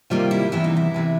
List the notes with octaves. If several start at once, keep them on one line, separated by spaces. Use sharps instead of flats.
C3 D#3 G3 A#3 F4
E4
E2 C3 E3 E4
D#4
E4
E2 C3 E3